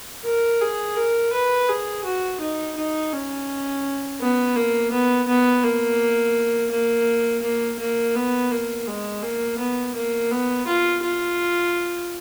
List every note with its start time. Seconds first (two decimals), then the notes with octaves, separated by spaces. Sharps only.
0.25 A#4
0.61 G#4
0.96 A#4
1.33 B4
1.69 G#4
2.05 F#4
2.40 D#4
2.77 D#4
3.13 C#4
4.21 B3
4.56 A#3
4.91 B3
5.28 B3
5.63 A#3
6.71 A#3
7.43 A#3
7.79 A#3
8.15 B3
8.51 A#3
8.87 G#3
9.23 A#3
9.58 B3
9.95 A#3
10.31 B3
10.67 F4
11.02 F4